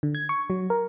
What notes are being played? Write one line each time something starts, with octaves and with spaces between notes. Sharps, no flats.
D3
G#6
C#6
F#3
A#4